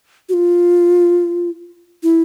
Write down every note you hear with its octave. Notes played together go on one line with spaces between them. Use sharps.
F#4
F4
E4